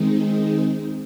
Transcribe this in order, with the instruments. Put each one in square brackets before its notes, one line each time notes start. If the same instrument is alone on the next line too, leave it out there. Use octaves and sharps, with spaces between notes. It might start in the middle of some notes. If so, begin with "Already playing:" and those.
Already playing: [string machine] D#3 G#3 C4 D#4